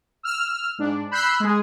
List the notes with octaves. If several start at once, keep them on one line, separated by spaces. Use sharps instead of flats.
E6 F6
G#2 D4
B5 E6 F#6 G6 B6 C7
G#3 G#4